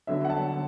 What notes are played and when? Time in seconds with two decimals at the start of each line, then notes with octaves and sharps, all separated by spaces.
0.07 D3 F#3 B3 E5
0.25 F#5
0.30 A5
0.53 D3